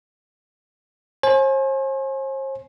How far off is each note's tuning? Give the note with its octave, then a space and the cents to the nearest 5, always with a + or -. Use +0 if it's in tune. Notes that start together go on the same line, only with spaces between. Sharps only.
C5 +45 G#5 +25